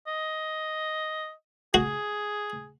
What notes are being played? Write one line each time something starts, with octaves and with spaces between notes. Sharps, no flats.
D#5
F#4 G#4